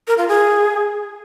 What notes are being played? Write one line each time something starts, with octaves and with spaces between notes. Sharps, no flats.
A#4
F4
G#4